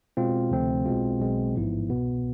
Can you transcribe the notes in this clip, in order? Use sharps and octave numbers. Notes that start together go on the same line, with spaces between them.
B2 G#3 C4 F4
D2 C3 F3 A3 C4
B1 B2 G#3 C4 F4
B1 B2 G#3 C4
A1 G#2 F3 B3 E4
C2 B2 B3